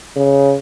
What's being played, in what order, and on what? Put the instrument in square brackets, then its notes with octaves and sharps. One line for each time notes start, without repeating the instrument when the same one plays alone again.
[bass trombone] C#3